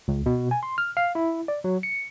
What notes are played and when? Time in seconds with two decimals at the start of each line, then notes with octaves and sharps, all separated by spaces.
0.08 C#2
0.26 B2
0.51 G#5
0.63 C6
0.78 F6
0.97 F5
1.15 E4
1.48 D5
1.64 F#3
1.83 C#7